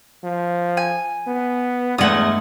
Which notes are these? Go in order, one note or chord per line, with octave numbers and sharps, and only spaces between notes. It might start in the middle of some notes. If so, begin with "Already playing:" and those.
F3
G#5
B3
E2 G2 G#3 A3 F#5 D#6